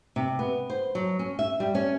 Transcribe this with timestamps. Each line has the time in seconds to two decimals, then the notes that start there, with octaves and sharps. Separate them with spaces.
0.16 C3
0.39 B3
0.70 C5
0.95 F#3
1.19 C#4
1.39 E5
1.60 G3
1.75 C#4